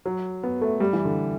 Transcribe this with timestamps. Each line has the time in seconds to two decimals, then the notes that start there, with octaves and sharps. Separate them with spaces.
0.05 F#3
0.43 B3
0.61 A3
0.80 G3
0.93 E3
1.05 D3